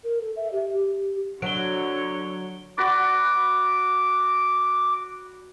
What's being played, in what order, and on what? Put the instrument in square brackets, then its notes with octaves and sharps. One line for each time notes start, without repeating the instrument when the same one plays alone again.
[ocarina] A#4
A4
E5
G4
G4
[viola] D3 C#5 [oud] F#3 [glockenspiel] D7 G7
[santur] F#4 B4 D5 [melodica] D6